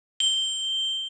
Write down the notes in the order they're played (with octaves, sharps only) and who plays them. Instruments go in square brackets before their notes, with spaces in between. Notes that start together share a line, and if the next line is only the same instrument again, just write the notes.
[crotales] G7